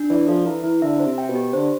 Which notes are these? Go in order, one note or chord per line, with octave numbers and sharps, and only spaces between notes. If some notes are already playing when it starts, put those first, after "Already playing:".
Already playing: D4
E3 D5
F3 A4
E3 E4
E3 E4
D3 E5
C5
C3
G5
B2
G4
D3 C5